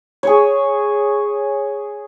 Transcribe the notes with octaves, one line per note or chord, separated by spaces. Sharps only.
G#4 C#5